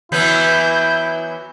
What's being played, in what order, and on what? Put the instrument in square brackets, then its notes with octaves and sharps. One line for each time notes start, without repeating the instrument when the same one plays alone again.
[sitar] E3 F#3 B3 [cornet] E4 [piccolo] G6